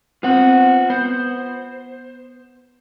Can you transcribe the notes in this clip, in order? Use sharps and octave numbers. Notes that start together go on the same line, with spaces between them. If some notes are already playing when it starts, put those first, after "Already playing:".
B3 C4 F4 F#5
B3 C5